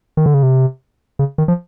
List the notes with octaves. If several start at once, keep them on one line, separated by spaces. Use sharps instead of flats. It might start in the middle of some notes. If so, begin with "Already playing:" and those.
D#3
D3
C#3
C3
C#3
D#3
F3